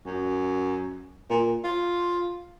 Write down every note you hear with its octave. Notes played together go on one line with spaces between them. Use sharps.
F#2
A#2
F4